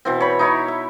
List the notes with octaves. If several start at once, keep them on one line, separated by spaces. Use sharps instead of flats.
B2 E3 C4
C#5 B5
D#4 E4 C#5
E5